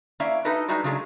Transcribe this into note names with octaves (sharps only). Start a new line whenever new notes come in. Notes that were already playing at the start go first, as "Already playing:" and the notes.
A#3 C#4 E4 D5 E5 F5
D#4 E4 F#4 A4 B4 D#5
G3 G#3 D#4 E4 F#4 D5
C#3 F#3 G#3 A3 D4